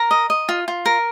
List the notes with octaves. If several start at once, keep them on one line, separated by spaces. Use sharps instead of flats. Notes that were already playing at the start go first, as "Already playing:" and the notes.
Already playing: A#4 A#5
D#5
D#5
F4
F4
A#4